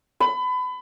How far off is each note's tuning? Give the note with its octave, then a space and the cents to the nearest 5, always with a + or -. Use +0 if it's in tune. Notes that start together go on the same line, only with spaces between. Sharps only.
B5 +30